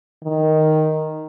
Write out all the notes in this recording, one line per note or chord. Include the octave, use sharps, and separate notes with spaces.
D#3